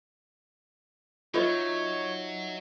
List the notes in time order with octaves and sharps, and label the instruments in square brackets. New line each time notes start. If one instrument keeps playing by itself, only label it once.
[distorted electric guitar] F#3 [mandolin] D#4 E5 [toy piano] F4 B4 D#5 [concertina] C#5